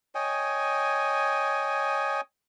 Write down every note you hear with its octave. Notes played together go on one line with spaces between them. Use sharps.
C#5 D#5 G5 G#5